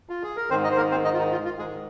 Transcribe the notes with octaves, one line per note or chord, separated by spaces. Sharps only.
F4
G#4
A#4
G#2 D#3 C4 C5
D#4 D#5
C5
A#3 A#4
C4 C5
D#4 D#5
F4
D#4
F4
F4
G#2 D#3 G#3 G#4